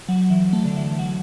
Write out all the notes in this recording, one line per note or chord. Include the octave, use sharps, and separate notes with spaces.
F#3
E3
A3
D3
E3
F#3